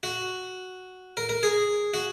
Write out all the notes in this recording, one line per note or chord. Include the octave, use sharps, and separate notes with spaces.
F#4
A#4
A#4
G#4
F#4